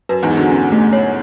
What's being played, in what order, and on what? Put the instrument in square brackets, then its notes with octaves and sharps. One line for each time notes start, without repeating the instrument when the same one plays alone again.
[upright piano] F#2 [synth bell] B4
[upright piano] E2 G#2
[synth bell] G#4
[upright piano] D3 F#3
[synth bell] C#4
A3
C#5